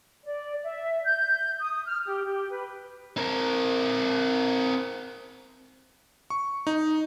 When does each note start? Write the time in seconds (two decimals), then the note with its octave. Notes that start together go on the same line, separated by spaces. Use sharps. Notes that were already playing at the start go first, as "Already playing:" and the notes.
0.25 D5
0.63 E5
1.04 G6
1.60 D#6
1.85 F6
2.06 G4
2.24 G4
2.50 B4
3.17 C4 A#4
6.30 C#6
6.67 D#4